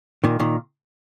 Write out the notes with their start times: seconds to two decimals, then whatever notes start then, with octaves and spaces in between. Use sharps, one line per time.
0.24 A#2 D#3
0.40 A#2 D#3